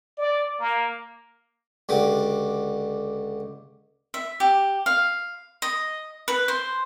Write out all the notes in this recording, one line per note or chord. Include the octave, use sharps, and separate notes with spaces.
D5
A#3
C#2 D3 G4 D6
E5
G4
F5
D#5
B4
C5